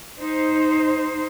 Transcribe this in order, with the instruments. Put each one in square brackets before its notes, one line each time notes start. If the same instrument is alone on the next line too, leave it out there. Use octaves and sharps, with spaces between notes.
[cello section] D#4 C5